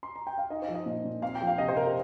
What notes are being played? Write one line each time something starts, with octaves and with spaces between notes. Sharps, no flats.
C6
A#5
G5
F5
D#4 D#5
C5
F3
D#5
A#2
A#2
C4 F5
G5
F3
F5
C3 D#5
C5
C3 A#4
A#4